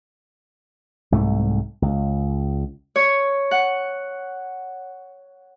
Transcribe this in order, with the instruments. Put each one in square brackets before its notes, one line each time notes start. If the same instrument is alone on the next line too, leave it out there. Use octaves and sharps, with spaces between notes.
[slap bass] C2 G#2 A3
C#2
[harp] C#5
F#5